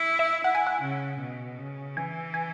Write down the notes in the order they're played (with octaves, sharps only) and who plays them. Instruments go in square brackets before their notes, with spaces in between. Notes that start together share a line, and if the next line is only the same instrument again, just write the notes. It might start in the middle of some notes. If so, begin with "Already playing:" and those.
Already playing: [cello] E4
[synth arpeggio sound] E5
[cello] E4 [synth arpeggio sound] F#5
[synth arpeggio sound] G#5
F#5
[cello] C#3
B2
C#3
[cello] E3 [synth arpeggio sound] G#5
[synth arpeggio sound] G#5